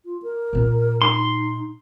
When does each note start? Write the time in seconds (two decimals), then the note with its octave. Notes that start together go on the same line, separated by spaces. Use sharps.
0.05 F4
0.23 A#4
0.53 A#2 C4
1.02 D#4 C6